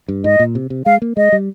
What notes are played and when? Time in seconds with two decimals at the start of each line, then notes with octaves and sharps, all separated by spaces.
0.08 G2
0.24 G#2 D#5
0.39 A#2
0.55 C3
0.70 C3
0.86 G#3 F5
1.02 A#3
1.17 G#3 D#5
1.32 G3